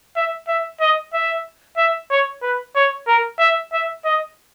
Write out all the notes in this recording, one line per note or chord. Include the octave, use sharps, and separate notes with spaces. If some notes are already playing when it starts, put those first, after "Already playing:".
E5
E5
D#5
E5
E5
C#5
B4
C#5
A#4
E5
E5
D#5